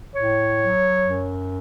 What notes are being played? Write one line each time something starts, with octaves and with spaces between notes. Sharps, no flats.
A2 C#5
F#3
F#2